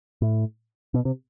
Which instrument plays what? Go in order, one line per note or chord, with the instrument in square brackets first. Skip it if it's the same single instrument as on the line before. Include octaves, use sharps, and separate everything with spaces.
[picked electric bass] A2
B2
C3